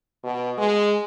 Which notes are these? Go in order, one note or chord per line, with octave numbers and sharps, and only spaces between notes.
B2
G#3